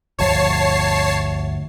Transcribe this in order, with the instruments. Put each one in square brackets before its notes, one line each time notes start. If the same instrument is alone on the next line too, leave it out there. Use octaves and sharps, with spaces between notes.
[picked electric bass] G1 D2 F3 [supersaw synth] C#5 A5 C7